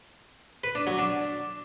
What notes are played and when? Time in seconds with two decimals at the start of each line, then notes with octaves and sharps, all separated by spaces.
0.64 B4
0.75 D4
0.87 F#3
0.99 D4